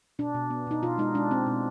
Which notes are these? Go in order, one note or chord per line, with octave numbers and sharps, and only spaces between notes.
B2 D4
B2
B3
B2 D#4
B2 F4
G#3 D#4
G#3 D4
C4
B2